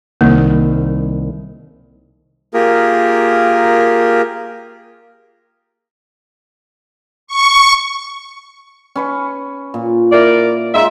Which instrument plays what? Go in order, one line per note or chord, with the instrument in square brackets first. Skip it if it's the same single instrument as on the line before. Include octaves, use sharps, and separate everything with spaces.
[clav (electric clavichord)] C2 D#3 [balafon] A#3
[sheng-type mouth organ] A#3 F4 G4 G#4 A#4
[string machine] C#6
[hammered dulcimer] C#4 B4 C#6
A#2
[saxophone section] E4 A#4 D5
[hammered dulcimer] G#3 D#4 F4 [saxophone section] E5